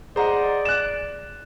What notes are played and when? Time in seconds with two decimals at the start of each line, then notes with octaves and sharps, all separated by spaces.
0.16 G#4 C5 D5 D#5 F#5 A#5
0.65 F#6 E7